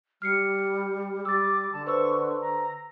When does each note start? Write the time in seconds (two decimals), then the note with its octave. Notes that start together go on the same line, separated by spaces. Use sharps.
0.22 G3 F6 C7 C#7
1.25 G3 D6 E6 A6
1.73 D3 A5
1.87 B4 C5 C#6 E6
2.41 A#5